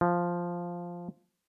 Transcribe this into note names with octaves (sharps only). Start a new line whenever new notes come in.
F3